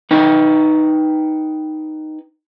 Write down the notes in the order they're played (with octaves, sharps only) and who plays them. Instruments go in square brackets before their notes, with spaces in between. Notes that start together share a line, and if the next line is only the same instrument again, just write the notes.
[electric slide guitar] D#4 B4 G5